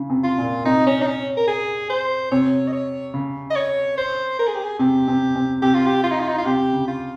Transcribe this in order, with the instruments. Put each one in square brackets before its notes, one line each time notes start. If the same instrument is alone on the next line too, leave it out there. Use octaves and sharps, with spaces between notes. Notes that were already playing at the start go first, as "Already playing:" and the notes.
Already playing: [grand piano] C#3
C3
[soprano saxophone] F4
[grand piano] A#2
[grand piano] C3 [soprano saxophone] D#4
[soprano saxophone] C#4
D#4
C#4
A#4
G#4
C5
[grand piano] C3 [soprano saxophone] C#5
[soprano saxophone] D#5
C#5
[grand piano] C#3
[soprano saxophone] D#5
C#5
C5
A#4
G#4
G4
G#4
[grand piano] C3 [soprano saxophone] G4
[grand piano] C3
C3
[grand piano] C3 [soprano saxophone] G4
[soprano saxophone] F4
G4
F4
D#4
F4
D#4
F4
[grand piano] C3 [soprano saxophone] G4
[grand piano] C#3
[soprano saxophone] F4